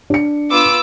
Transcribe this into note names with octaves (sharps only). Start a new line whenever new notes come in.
D4 C#7
B3 F4 D6 E6